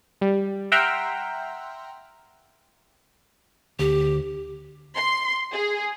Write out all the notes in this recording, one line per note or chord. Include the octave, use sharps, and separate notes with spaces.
G3
E5 F#5 G5 A#5 C6 F6
D2 G4
C6
G#4